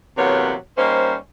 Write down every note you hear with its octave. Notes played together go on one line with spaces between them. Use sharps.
E2 C3 F#3 A#3 B3 C#5
G3 A#3 C#4 D#4 C5